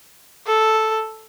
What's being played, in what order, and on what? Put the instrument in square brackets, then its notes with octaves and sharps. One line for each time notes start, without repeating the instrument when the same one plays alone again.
[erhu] A4